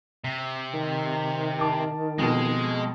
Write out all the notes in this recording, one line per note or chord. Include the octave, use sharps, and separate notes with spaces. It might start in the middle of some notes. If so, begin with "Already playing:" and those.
C3
D#3
A5 D6
F2 B2 G#3